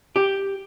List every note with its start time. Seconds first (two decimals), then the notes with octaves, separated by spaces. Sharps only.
0.16 G4